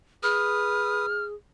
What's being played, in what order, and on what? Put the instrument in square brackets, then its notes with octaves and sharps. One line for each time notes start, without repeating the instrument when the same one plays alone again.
[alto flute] G#4 [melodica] B4 D#6 [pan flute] F6